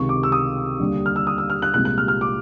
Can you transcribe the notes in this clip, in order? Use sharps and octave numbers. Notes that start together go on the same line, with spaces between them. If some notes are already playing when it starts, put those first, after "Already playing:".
Already playing: C#2 C3 D#3 C#6
D6
E6
D#6
D#2 D3 G3
F6
E6
D#6
E6
F6
F#6
C2 A#2 F3 G#3 F#6
F#6
F6
F6
D6